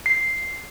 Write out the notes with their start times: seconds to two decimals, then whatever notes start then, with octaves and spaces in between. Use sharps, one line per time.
0.06 C7